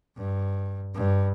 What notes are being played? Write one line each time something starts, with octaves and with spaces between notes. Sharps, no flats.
G2
G2